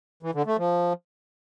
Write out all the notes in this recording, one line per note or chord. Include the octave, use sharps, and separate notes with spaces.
E3
D3
A3
F3